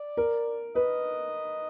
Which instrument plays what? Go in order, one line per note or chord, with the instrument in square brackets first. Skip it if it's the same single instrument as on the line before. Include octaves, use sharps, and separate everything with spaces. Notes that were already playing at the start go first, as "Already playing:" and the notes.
Already playing: [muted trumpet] D5
[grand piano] A#4
[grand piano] B4 [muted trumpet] D#5